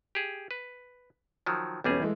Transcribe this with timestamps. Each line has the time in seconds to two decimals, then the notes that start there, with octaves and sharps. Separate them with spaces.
0.15 G4 G#4
0.51 B4
1.46 D#3 F3 F#3
1.84 B1 E2 G3 C#4 G#4
2.00 E3 G#3 A3